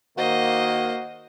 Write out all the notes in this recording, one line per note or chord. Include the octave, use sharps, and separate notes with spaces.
D#3 A#3 F#4 C5 D#5